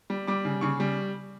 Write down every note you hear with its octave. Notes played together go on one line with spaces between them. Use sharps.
G3
G3 D6
C#3
C#3 C#6
G3